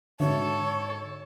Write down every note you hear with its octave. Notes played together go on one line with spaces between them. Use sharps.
G#2 D3 F#4 A4 C#5 E5